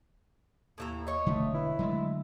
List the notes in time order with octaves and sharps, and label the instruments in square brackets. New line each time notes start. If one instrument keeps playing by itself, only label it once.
[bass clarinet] D#2 [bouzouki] A2 E3 A#5
[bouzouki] C#5 D#5
[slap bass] E1 D3 [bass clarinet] A3
[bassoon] E4 [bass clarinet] B4
[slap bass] D3 F#3 A3 [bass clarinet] G#3